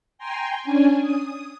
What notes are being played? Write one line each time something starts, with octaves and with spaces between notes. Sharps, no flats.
G5 G#5 A#5 C6
C#4 D4 G#5
D#6